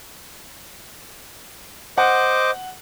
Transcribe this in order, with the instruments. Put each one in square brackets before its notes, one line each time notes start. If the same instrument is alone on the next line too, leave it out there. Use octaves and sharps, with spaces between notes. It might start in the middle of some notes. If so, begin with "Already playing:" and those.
[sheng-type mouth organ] C5 D#5 D6 [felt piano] F#5